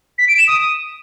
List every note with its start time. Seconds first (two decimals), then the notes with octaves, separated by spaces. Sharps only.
0.18 B6
0.28 D7
0.38 E7
0.48 D#6